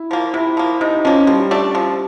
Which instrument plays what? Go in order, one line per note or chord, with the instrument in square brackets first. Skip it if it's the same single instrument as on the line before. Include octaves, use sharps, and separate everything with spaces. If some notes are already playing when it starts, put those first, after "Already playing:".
Already playing: [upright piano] E4
[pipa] F3 A#3
[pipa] C3 [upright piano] E4
[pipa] F3 A#3
[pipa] C3 [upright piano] D#4
[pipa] F3 A#3 [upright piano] C#4
[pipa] F3 [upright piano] G3
[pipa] A3 D4
F3